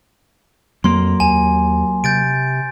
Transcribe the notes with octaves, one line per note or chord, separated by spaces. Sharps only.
F2 F#3 A#3 C6
D#2 G#5
C3 G6 A6 D7